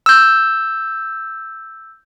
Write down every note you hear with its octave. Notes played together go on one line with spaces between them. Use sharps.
E6 G6